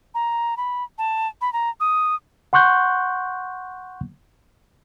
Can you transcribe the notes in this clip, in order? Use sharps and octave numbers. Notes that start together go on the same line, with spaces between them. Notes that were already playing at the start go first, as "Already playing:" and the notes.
A#5
B5
A5
B5
A#5
D#6
F#5 C6 C#6 F#6 G6